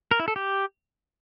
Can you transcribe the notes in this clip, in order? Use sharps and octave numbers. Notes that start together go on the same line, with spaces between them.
A#4
E4
A4
G4